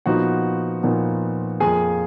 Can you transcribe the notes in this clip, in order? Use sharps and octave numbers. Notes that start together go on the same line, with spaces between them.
A#2 F3 B3 D#4 F#4 F#5
A#2 F3 B3 D#4
F2 F3 A#3 G#4 G#5